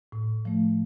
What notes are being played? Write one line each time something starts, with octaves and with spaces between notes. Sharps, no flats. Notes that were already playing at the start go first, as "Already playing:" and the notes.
A2
F3 A3